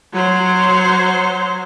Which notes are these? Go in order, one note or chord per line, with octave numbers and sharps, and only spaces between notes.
F#3 C5